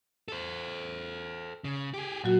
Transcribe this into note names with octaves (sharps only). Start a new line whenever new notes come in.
A4 C5
C#3
G4 G#4
A#2 F#3 F#4